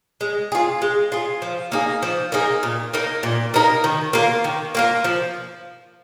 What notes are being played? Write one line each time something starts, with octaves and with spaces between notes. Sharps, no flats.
G#3
F4 G#4
G#3
F4 G#4
F3
A#3 D#4 G#4
F3
A#3 D#4 G#4
A#2
A#3 D#4 A#4
A#2
A#3 D#4 A#4
D#3
A#3 F4 A#4
D#3
A#3 F4 A#4
F3